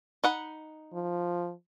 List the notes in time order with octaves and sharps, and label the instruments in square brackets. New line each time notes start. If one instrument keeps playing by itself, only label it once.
[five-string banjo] D#4 F#5 B5
[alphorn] F3